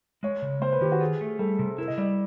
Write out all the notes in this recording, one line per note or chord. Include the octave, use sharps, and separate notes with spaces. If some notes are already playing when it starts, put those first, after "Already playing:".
G#3 C#5
C#3
A#3 C5
B4
D#3 G4
F#4
F4 G#4
A3
G3 A4
C3
E4 A#4
D#5
G3 D5